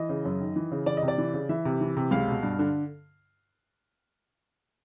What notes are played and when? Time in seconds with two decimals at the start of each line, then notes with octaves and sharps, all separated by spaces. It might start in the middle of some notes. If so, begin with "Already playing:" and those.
Already playing: E3 D#5
0.09 C#3
0.25 F#2
0.40 D#3
0.56 E3
0.71 C#3
0.86 E3 D5
0.97 D#5
1.02 C3
1.08 D5
1.18 E3
1.34 C#3
1.49 E3 E5
1.65 C3
1.81 E3
1.96 C3
2.11 C#2 F5
2.28 B2
2.43 G2
2.59 D3